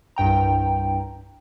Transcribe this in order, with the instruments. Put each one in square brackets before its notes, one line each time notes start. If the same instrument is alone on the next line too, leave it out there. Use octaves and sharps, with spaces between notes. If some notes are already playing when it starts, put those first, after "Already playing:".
[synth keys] C2 G2 G5 A#5